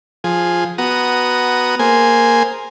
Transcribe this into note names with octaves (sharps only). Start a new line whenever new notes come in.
F3 G#4
B3 F#4 A#5 D#6
A#3 G#4 C5 G#5